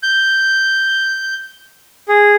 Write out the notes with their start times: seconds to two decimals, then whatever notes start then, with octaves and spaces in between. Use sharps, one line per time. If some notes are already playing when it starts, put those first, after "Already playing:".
0.03 G6
2.08 G#4